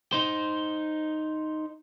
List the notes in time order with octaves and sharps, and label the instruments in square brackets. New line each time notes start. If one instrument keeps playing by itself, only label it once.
[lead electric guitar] D#4 C5